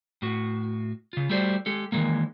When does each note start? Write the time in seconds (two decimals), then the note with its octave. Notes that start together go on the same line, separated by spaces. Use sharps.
0.22 A2 F#4
1.13 C#3 F4
1.30 G3 A3 F#4 G4 C5 D5
1.66 G#3 G4 A4
1.92 D#3 E3 G#3 A#3